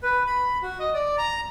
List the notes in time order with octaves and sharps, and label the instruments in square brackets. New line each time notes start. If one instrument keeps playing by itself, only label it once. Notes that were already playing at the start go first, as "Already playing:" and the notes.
[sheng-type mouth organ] B4
B5
F#4
D#5
D5
A#5